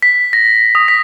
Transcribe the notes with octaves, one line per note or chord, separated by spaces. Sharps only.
B6
A#6
D#6
B6